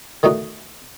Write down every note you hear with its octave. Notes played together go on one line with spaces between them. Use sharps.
D3 D#3 A3 D#4 F#4